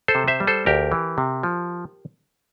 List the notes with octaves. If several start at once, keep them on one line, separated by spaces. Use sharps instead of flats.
A4 C5
C3
C5 E5
G3
A4 C5
D2 G4 A#4
E3
C3
F3